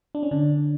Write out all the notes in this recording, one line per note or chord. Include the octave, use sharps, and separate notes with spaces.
D4
C#4
D3 D4